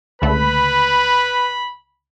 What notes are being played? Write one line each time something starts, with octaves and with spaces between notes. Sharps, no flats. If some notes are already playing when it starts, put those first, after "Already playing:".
C#2 D3 A3 B4 B5